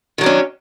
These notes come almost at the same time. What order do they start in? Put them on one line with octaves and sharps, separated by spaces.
D#3 F#3 D4 C#4